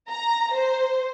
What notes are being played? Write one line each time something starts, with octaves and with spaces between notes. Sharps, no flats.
A#5
C5